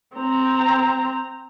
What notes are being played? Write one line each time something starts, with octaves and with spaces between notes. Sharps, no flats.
C4 A#5